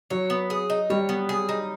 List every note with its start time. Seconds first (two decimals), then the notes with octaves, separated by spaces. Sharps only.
0.10 F#3 C#5
0.30 B3
0.50 G#4
0.70 D#4
0.90 G3 C#5
1.09 B3
1.29 G#4
1.49 D#4